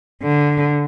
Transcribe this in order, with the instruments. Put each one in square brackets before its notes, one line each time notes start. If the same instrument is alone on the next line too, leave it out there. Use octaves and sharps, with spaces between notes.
[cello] D3